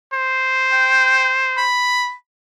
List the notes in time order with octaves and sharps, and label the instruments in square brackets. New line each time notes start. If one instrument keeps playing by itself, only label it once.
[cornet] C5
[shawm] G5
B5